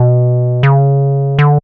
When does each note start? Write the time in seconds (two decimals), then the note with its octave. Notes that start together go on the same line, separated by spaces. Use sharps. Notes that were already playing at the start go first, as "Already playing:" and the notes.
Already playing: B2
0.63 C#3
1.39 D3